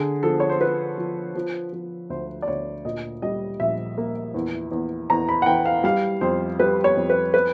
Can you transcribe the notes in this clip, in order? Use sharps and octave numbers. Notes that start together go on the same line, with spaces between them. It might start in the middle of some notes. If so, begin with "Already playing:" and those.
Already playing: D3 G#4
F3 A4
C#5
C5
F3 B4
F3
F3
F3
D2 C5
D5
D2 C#5
A#2 D#5
G3 D#5
A#1 E5
A#3
E2
E2
E2 A#5
B5
F#5
E3 G5
F5
G3 F5
F2 C5
G3 B4
C#5
F2
B4
B4